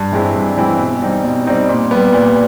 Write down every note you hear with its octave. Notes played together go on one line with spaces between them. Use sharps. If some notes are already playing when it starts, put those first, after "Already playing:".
Already playing: G2
E3 G#3 C4 E4
G2
E3 G#3 C4 E4
B2
G3 C4 D#4
B2
G3 C4 D#4
A#2
G3 B3
A#2